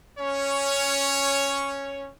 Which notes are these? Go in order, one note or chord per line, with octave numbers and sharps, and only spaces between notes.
C#4 C#5